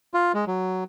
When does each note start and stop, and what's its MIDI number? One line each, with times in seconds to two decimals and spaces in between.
0.14 0.32 65
0.34 0.45 56
0.47 0.84 54